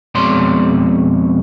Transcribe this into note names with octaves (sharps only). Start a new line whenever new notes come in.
F2 B2 G#3 C#5 D5 C6